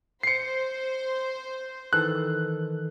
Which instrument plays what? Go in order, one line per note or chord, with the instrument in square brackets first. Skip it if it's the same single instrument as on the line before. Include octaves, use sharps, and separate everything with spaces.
[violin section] C5 [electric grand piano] C7 C#7
[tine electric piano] D#3 E3 A4 [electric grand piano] F#6